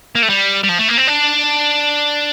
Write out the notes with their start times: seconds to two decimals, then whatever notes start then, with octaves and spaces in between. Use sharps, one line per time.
0.15 A#3
0.23 A3
0.29 G3
0.63 G3
0.69 F3
0.78 A3
0.88 A#3
0.98 C4
1.07 D4